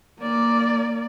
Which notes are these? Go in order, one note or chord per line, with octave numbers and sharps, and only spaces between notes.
A#3 D5